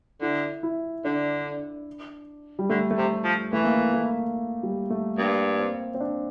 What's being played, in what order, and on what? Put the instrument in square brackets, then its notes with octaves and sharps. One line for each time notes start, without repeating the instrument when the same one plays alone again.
[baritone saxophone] D3 [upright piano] E4
[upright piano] E4
[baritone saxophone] D3 [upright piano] D4
[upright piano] G3
[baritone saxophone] D3 [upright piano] A3
[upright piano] A3
[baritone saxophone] C3
F3
[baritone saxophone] E3 [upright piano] A3
[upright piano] A#3
A3
A3
G3
A3
[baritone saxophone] G2 [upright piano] A#3
[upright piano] C4
C4
D4